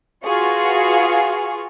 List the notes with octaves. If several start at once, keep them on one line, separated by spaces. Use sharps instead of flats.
F4 F#4 G#4 B4 F5 C#6